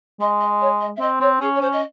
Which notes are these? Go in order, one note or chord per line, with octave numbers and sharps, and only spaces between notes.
G#3 D#5
D#5
C#5
D#5
E5
C4 D#5
C4 C#5
C#4 G#4
C#5
C#4 C5
D#5